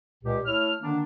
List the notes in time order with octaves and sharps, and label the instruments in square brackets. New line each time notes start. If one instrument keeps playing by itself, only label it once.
[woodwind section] C#2 A#2 G4
A3 E4 C#5 F6
D3 D#3 A#3 D4